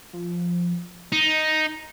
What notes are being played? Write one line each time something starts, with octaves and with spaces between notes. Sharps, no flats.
F3
D#4 A#5